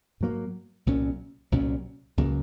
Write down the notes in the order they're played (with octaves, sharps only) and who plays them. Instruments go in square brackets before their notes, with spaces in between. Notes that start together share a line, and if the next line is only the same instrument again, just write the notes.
[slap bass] G#2 F#3 A#3
C2 A#2 F#3 C#4
C2 A#2 F#3 C#4
C#2 C#3 F#3 A#3